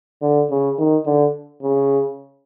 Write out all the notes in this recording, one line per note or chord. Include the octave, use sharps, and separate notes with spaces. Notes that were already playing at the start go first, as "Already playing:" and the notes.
D3
C#3
D#3
D3
C#3